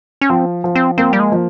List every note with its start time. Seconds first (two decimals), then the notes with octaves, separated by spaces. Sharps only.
0.21 C#4
0.30 F3 C4
0.64 F3
0.75 C4
0.98 A#3 C4
1.13 G3
1.20 G#3
1.32 F3